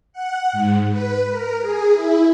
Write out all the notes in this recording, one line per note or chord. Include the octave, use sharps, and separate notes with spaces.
F#5
G#2
B4
A#4
G#4
E4